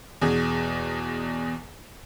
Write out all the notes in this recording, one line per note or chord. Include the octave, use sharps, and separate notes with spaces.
E2 B2 G#4